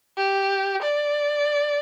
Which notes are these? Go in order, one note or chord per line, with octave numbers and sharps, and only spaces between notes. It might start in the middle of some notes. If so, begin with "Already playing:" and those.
G4
D5